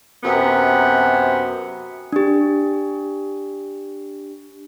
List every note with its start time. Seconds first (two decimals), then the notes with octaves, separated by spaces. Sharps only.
0.24 F#2 C3 B3
2.12 D4 G4